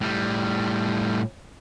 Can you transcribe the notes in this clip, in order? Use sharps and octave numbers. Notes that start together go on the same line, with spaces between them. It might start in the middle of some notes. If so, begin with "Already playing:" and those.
A2 G3